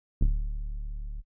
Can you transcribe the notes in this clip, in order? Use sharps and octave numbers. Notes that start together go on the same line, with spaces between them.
D1